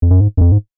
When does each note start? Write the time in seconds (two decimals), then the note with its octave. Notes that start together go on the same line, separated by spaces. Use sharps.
0.02 F2
0.10 F#2
0.20 G#2
0.37 F#2
0.41 F2
0.52 G#2